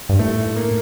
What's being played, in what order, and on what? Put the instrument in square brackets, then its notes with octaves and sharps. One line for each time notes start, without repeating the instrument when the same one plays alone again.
[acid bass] G2
[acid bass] A2 [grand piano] A3
[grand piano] A#3